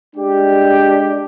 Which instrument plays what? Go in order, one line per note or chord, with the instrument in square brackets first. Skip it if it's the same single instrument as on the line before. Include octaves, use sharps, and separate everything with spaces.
[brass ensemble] G#3 D4 G4